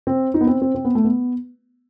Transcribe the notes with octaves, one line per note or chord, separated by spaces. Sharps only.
C4
D#4
B3
C4
C4
C4
B3
A3
B3